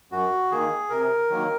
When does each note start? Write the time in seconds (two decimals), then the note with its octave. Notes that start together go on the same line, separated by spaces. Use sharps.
0.11 F#2 F#4
0.51 D#3 A#3 G#4
0.90 C3 A#4
1.30 D#3 F#3 A#3